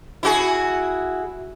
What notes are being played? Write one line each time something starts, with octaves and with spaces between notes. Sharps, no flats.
E4 F#4 G#4